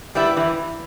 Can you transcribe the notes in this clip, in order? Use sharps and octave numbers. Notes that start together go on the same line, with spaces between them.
G3 B3 E4
E3